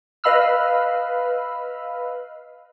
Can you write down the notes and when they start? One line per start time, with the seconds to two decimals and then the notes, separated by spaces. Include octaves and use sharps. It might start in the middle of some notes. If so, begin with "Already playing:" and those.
0.24 B4 D#5 F5 B5 E6 F6